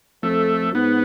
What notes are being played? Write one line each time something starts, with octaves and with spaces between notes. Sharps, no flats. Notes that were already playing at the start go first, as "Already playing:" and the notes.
F2 A3
G#2 B3